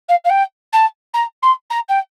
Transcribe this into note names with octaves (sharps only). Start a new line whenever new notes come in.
F5
F5
G5
A5
A#5
C6
A#5
G5